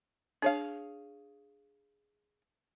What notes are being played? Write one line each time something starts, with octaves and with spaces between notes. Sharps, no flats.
D4 G#4 C#5 F5